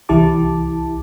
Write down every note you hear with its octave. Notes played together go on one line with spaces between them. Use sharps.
C2 E3 E4 G4 A5 D6